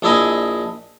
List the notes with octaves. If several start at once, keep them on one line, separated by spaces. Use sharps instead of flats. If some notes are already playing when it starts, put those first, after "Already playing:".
A#1 D4 E4 D#5 G#5